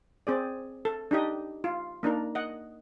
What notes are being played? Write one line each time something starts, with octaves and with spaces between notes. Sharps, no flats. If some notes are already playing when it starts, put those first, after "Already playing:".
C4 G#4 D5
A4
D4 D#4 G4 D#5
F4
A#3 D4 D#4 A#4
D#5 F#5